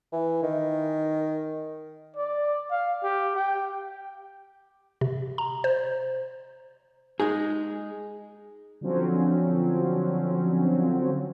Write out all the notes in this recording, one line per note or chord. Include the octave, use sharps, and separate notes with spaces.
E3
D#3
D5
F5
G4
G5
C3
A#5
C5
G#3 D#4 G#4
D3 F3 F#3 C4 C#4